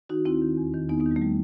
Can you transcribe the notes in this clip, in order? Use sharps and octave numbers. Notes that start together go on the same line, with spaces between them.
D#3 D#4 F#4
D#2 C4 E4
D#3
E2
D#3
E2 B3 D#4
B3 D#4
D#3
G3
A3
G3